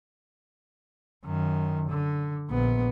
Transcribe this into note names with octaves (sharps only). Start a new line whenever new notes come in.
F#2 D#3
D3
A#1 B3